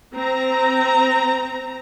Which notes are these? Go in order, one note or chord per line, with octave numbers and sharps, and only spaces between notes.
C4 A#5